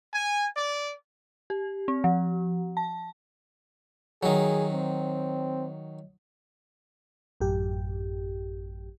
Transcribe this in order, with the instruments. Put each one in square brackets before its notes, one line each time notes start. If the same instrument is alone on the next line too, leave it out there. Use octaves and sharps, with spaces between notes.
[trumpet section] G#5
D5
[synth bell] G4
C4
F3
A5
[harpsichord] D#3 F#3 [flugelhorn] G#4
[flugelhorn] C4
[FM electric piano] A1 F#2 G4